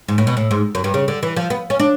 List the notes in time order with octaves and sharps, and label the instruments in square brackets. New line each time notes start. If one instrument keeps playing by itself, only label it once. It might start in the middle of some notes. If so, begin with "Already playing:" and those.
[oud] G#2
A2
B2
A2
G#2
F#2
G2
C#3
D3
E3
F3
B3
C#4
D4